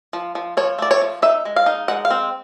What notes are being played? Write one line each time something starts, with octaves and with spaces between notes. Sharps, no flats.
F3
F3
F3 C#5
A3 D5
C#5
F3
D#4 E5
G#3
F5
D#4
G#3 F#5
F5
C4